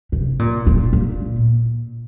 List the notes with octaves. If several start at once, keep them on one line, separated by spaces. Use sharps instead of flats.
C3
A#2
A#2
A#2